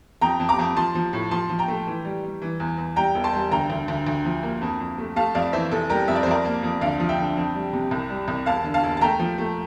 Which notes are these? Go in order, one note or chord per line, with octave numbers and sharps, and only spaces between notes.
F2 G5 A#5
F2
A#5 D6
F2
F3 A5 C6
F3
A2
F3 A5 C6
F3
G5 A#5
A3
E3
G3
G3
E3
E2
E2
G3 G5 A#5
E1
A5 C6
G3
D2 G5 A#5
D2
D2
D2
F3
A#3
F2
F2
A3
A3 F5 A5
F2 D5 F5
E3 C5 E5
F1 A4
G3 G4 A#4
F2 E5
D5
C5
F2 A#4 D5
A#3
F2
D2 D5 F5
F3
E5 G5
D3
F2
G3
C3
C2
G3
C2
E1 F5 A5
D3
F5 A5
E1
A5
A3 G5 A#5
F3
A3